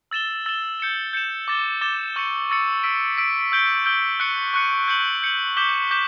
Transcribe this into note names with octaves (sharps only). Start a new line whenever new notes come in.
E6 A6 E7 G7
E6 A6 E7 G7
G6 C#7 E7
G6 C#7 E7
D6 A6 E7 G7
D6 A6 E7 G7
C#6 E6 A6 C#7
C#6 E6 A6 C#7
E6 B6 D7
E6 B6 D7
E6 G6 D7 G7
E6 G6 D7 G7
C#6 F#6 C#7
C#6 F#6 C#7
G6 C#7 F#7
G6 C#7 F#7
D6 G6 B6 E7 G7
D6 G6 B6 E7 G7